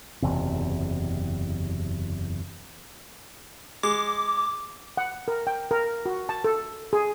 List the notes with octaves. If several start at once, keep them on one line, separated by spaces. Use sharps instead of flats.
F#1 E2 C3
G#3 D6
F#5
A#4
G5
A#4
F#4
A5
A4
G#4